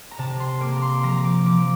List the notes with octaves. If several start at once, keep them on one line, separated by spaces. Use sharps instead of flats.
A#5
C3 A5
C6
A#3 D6
A#5
C6
F3 A#5
D6
F3 D6